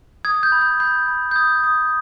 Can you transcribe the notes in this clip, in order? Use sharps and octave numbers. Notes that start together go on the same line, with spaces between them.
D#6 G#6
G6
B5
G#6
B5 G6
B5
G6
D#6 G#6
D#6